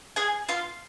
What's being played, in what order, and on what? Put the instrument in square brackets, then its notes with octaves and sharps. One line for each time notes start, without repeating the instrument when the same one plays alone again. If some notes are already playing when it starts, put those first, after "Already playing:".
[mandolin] G#4 G#5
F4 F5